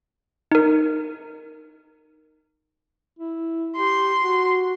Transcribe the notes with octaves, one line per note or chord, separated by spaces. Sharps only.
D#4 A#4
E4
G4 C6
F#4